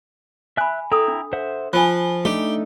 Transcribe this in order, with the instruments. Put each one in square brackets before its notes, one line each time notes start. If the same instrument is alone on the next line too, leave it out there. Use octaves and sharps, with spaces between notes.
[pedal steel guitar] E5 F#6 [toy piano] G#5 B5
[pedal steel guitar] E4 G5 A#5 [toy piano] A4 D#6
[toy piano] D4
[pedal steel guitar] C5 E5 F#5
[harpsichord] F3 [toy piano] G#5 B5 [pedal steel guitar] F#6
[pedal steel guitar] A3 D4 D#4 [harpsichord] G4